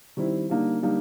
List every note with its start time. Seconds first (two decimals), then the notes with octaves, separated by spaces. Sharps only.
0.17 D#3 G3 C4 E4
0.49 D3 G3 A#3 D#4
0.82 D3 G3 A#3 D#4